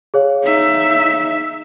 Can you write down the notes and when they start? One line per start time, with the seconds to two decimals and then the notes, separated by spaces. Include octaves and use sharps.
0.14 G#4 C#5 F5
0.43 D#4 E5